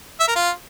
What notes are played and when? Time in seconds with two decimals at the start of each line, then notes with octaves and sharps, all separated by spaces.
0.20 E5
0.28 A#4
0.36 F4